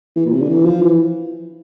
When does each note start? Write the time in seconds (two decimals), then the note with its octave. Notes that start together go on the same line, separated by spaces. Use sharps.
0.16 E3
0.26 A#2
0.33 C3
0.42 D3
0.49 E3
0.66 F3
0.81 E3